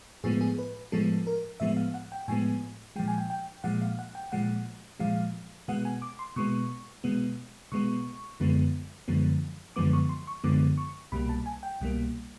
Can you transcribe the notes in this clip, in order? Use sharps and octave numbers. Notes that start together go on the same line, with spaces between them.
A2 F3 G#3 B3 G#4
G#4
B4
A2 F3 G#3 B3 A4
A#4
A2 F3 G#3 B3 E5
F5
F#5
G5
A2 F3 G#3 B3 G#5
A#2 F3 G#3 G5
G#5
G5
G5
A#2 F3 G#3 F#5
F5
F#5
G5
A#2 F3 G#3 F#5
A#2 F3 G#3 F5
B2 G#3 B3 F#5
G#5
D6
C6
B2 G#3 B3 C#6
B2 G#3 B3
B2 G#3 B3 C#6
F#2 D3 F3 G#3 B3
F#2 D3 F3 G#3 B3
F#2 D3 F3 G#3 B3 D6
C#6
C6
C#6
F#2 D3 F3 G#3 B3 D6
C#6
C2 B2 G3 A#3 B5
A5
G#5
G5
C2 B2 G3 A#3